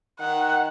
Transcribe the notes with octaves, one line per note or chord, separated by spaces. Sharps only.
D#3 F#5